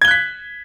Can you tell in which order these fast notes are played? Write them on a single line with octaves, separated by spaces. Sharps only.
G#6 G7 F#6 B6